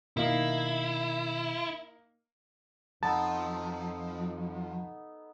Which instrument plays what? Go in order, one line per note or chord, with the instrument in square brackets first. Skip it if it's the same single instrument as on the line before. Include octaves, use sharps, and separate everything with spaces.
[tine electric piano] B2 D#3 [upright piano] A#3 D#4 F5 [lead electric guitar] E4
[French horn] F2 [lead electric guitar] F3 [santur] B3 D#4 A4 [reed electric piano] A5